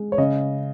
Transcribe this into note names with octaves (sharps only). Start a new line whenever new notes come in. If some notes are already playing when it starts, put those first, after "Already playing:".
Already playing: G#3
C#5
C#3 D#5